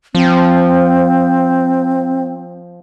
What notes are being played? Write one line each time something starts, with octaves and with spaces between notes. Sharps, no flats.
F3 C4